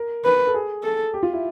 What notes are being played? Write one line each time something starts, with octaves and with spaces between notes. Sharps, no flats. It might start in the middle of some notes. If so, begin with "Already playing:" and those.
Already playing: A#4
B4
A4
G#4
A4
G4
F4
E4